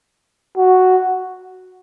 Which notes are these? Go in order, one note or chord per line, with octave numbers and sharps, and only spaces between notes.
F#4